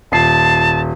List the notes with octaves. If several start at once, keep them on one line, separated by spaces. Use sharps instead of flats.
D#1 A5 C7